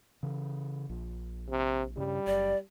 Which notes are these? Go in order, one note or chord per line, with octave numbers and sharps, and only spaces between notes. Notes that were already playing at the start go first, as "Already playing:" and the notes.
C#3 E3
A#1
C3
G2 C#3 G3
F#1 D5